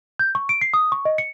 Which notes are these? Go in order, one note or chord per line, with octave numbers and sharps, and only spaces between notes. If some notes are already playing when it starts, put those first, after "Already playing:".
G6
C#6
D7
C7
D#6
C#6
D#5
C#7